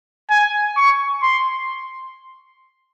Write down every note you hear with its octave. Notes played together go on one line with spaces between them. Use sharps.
G#5
C#6
C6